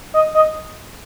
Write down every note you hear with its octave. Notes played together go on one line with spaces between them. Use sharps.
D#5
D#5